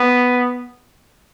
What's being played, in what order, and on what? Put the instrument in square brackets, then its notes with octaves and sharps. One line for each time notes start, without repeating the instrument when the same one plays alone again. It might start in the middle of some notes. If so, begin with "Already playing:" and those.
Already playing: [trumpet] B3